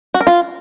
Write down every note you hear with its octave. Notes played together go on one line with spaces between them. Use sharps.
F#4
A#4
F4